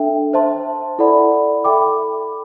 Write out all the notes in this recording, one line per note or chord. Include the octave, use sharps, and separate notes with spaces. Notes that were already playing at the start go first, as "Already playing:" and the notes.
Already playing: D4 A4 E5 G5
C5 E5 A5 C6
E4 A4 D5 F#5 B5
A4 E5 G5 B5 D6